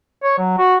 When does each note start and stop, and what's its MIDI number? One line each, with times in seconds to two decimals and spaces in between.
0.23 0.35 73
0.38 0.54 54
0.58 0.76 66